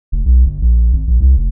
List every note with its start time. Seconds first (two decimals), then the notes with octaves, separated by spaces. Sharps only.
0.12 F1
0.25 B1
0.46 G1
0.62 A#1
0.93 G#1
1.07 A#1
1.20 C2
1.37 F1